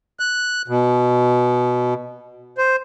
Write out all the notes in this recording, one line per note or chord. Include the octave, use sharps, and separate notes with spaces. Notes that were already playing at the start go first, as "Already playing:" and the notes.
F#6
B2
C5